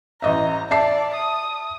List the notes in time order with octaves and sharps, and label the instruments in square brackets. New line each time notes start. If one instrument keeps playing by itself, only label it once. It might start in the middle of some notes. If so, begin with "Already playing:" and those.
[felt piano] A1 D#5 E5 [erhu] A#5
[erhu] D5 [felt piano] E5 A5 C7
[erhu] D#6